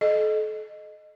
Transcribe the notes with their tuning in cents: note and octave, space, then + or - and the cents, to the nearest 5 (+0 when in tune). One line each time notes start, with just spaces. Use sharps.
A4 -35 D#5 -15